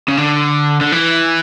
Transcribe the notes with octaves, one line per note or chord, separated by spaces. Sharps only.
C#3
D3
D3
E3